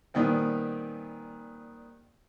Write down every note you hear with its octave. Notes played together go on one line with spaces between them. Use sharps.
A#2 D#3 G3 B3 C4